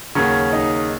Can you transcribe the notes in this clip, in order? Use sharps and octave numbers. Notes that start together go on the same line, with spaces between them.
D#2 C#3 F#3 C#4
D#4